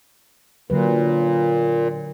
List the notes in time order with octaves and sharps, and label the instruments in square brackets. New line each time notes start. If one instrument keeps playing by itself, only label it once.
[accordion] A#2 [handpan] D3 F#3 B4